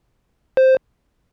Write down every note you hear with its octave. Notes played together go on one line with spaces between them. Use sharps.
C5